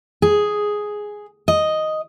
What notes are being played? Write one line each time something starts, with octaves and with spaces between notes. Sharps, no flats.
G#4
D#5